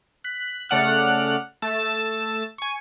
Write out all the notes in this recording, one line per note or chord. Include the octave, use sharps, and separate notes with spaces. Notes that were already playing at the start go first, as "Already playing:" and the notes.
F#6 B6
C#3 A3 D5 F#5 F6 F#6
A3 E6 A6 E7
G#5 C#6